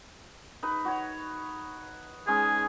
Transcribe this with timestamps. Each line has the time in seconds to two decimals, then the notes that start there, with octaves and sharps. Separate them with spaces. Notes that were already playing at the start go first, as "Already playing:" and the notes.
0.63 D#4 B4
0.85 F#4 C#5
2.27 G#3 C#4 D#4 G#4